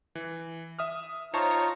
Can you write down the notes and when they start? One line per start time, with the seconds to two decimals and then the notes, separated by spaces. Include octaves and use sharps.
0.15 E3
0.79 E5 D#6 F6
1.34 D#4 F4 C5 C#5 A5 A#5 C#6